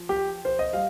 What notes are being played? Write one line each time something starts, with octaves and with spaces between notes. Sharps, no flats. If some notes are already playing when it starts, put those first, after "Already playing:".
Already playing: F3
G4
C5
D#5
G3 F5